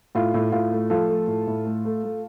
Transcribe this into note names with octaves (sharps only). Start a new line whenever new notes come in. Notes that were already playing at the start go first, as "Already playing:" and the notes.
A2 F4
A2
A2 F4
A3
F3 F4 A4
A3
A2
A2
A3
A3
A3